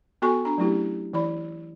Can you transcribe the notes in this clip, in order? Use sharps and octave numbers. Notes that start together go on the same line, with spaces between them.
B3 F#4 A4 G#5 C#6
D4 A#5
F#3 A3 C#4 E4 G4
E3 E4 D5 B5